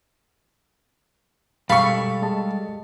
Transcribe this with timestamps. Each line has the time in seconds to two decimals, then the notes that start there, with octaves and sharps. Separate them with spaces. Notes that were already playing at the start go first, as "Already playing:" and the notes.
1.70 B2 G3 G#3 A4 F5 B5 C#6
2.23 G#3 D#5 A5